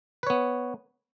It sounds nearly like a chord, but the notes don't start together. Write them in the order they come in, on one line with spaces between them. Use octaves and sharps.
B4 C#5 B3